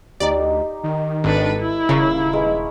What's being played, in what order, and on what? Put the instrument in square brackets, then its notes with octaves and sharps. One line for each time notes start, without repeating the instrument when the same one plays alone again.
[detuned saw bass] D2 [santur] D#4 G4 [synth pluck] D5
[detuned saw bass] D#3
[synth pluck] G#1 [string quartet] D4 A4 B4
[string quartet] E4
[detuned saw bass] D#1 [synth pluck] C#3 [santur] A#4 C#5 F5
[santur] G#3 B4